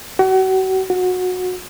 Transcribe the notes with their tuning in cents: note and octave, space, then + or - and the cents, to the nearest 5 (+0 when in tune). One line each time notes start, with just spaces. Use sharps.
F#4 +35
F#4 -20